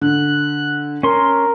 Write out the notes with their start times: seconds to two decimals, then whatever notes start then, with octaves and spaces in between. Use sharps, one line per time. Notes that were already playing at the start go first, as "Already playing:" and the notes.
0.01 D3 F#6
1.03 C#4 A#4 C6